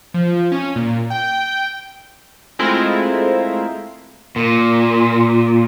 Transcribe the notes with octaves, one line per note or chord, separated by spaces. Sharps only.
F3
C#4
A#2
G5
G#3 A3 C4 E4 F4 A#4
A#2